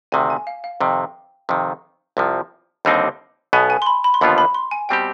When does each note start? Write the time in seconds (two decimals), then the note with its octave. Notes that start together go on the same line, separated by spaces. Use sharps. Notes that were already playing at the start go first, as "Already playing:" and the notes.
0.12 D2 C3 D#3 G#5
0.30 G#5
0.47 F5
0.64 F5
0.80 F2 C3 D#3 G5
1.49 F2 C3 D#3
2.17 C2 C3 F3
2.85 D#2 D3 G3 C4 D#4
3.53 B1 B2 B3 G#5
3.70 G#5
3.82 C6
3.86 B5
4.04 B5
4.14 C6
4.21 D#2 D3 F3 B3 F4 B5
4.38 B5
4.54 C6
4.71 G#5
4.89 B2 G3 C4 G4 G5